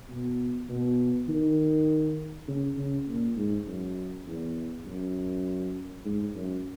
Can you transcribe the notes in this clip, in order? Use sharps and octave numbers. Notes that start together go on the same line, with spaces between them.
B2
B2
D#3
C#3
C#3
A#2
G#2
F#2
E2
F#2
G#2
F#2